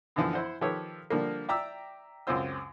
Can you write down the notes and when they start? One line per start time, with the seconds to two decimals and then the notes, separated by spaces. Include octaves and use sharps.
0.16 F#2 D3 E3 F3
0.33 E4 C5 F#5
0.61 D#3 F3 G4 A4 B4 C#5
1.10 D3 F3 G3 A#3
1.49 D5 E5 G5 A#5 D6 E6
2.27 C#2 F#2 C4 F4 C5 E6